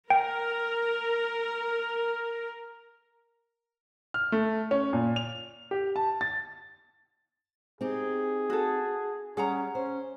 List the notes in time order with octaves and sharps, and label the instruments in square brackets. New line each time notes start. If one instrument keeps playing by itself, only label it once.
[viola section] A#4 [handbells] G5
[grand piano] F6
A3
C#4
A#2
F7
G4
A5
A6
[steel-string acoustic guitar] C4 D#4 G4 [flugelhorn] G#4
[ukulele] F#4 A4
[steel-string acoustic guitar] G3 [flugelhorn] C#4 [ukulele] G#4 F#5 A#5
[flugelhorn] C#4 [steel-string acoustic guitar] C5